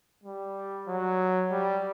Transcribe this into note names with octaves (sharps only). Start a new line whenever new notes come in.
G3
F#3
G3